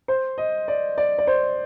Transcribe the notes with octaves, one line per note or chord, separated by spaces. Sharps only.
C5
D#5
D5
D5
D5
C5